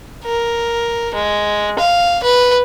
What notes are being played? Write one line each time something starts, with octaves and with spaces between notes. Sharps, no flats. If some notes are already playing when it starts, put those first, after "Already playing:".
A#4
G#3
F5
B4